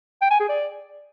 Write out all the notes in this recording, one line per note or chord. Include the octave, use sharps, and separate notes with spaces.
G5
G#5
G#4
D5